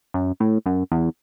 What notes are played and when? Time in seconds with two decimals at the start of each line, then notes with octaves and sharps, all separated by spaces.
0.14 F#2
0.40 A2
0.66 F#2
0.92 E2